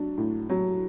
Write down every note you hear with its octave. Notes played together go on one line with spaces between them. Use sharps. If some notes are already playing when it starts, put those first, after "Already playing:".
Already playing: F#3 D4
A2
F#3